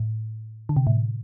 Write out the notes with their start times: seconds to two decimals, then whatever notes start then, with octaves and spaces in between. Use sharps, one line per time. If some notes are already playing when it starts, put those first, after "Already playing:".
Already playing: A2
0.69 D3
0.76 C3
0.87 A2